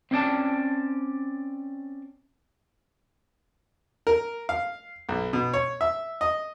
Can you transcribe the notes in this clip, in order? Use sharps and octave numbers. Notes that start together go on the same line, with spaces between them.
C4 C#4 D5 A5
A#4
F5
B1
B2
C#5
E5
D#5